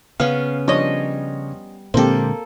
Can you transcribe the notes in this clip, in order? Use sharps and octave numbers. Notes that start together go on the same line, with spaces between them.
C#3 B3 C#4 F5
F3 G3 D4 C#5 D#5
A#2 D3 G#3 A#3 C4 G4 A4